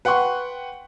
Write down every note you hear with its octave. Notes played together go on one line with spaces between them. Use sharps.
B4 F#5 G5 C6 C#6